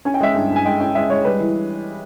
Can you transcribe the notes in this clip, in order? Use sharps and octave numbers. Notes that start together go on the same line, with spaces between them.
C#4 G#5
G5
G#3 E5
G2 G5
G2
G#5
G#3 G5
C#4 G5
G#3 E5
G#3 C#5
G3 B4
E3